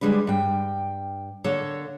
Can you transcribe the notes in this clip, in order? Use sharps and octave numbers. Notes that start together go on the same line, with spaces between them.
D3 G3 G#3 D4 B4
G2 G5
D3 A#3 A4 C#5